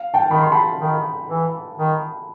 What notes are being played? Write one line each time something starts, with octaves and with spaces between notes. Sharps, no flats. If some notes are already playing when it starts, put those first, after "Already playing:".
Already playing: F5
G5 A5
D#3 B5
C6
A5 B5
D#3
E3
D#3